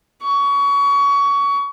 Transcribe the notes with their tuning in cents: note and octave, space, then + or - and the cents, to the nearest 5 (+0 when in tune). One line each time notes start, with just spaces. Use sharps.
C#6 +25